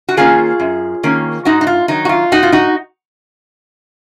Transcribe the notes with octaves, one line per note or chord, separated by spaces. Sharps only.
F#4
D#3 A#3 C#4 F4 G#4
F#2
D#3 A#3 C#4
G#2 D#4 F#4
D#4
F4
D#3 F#3 D#4
F#4
F4
G#2 D#4 F#4
F4
D#4 F#4